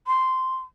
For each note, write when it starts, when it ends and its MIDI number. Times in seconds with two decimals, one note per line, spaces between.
0.07 0.56 84